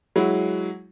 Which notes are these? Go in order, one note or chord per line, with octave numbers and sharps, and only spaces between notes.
F#3 G#3 E4